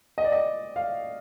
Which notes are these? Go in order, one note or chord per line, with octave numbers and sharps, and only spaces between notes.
D#5
D5
D#5
F5